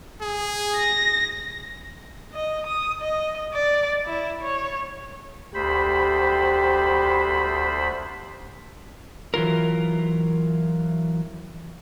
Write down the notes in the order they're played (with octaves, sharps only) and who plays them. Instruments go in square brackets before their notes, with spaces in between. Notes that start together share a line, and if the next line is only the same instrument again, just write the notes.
[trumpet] G#4
[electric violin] A#6
[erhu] D#5
D#6
D#5
D5
E4
C#5
[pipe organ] D2 C5 B5 [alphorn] G4
[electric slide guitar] E3 F#3 F4 A#4